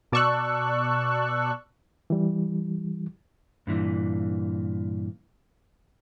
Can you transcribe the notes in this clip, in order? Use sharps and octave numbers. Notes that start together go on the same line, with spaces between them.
B2 D5 A5 C#6 E6 F#6
E3 G3
G2 A#2 E3